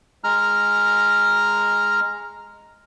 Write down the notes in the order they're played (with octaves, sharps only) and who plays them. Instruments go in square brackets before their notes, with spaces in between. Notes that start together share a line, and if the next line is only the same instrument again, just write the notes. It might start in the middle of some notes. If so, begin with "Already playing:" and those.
[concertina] G#3 A#5 F6